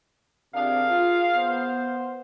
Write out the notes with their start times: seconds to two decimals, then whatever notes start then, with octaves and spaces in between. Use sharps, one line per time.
0.55 C3 D4 G#4 A#4 F5
0.90 F4
1.36 B3 C5